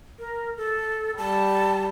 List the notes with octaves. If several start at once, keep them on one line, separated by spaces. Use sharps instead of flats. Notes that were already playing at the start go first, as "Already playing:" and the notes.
A#4
A4
G3 A5